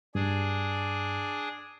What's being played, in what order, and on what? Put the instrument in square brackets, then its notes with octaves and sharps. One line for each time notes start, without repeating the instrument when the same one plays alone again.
[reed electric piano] G2 [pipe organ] D4 G#4